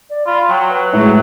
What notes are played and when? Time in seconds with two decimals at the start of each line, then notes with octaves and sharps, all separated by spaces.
0.10 D5
0.27 F4 B5
0.49 F#3 G5
0.70 B4
0.93 A2 F#3 G#3